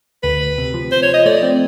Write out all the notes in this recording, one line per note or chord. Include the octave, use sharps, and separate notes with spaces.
D2 B4
D2
C3
F3
F3 C5
C#5
F3
D#5
A3 D5
C4